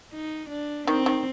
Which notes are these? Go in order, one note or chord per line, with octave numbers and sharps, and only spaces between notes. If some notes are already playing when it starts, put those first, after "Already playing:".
D#4
D4
D#3 C4
D#3